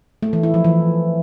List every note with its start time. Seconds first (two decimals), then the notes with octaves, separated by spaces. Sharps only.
0.23 A3
0.33 E3
0.43 E4
0.54 F3
0.64 E3